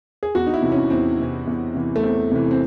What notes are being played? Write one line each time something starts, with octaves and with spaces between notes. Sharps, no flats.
G#4
E2 F#4
D#4
E4
C3 E3
C#4
E2 C4
C3 E3
E2
C3 E3
A3
E2 C4
C3 E3
C4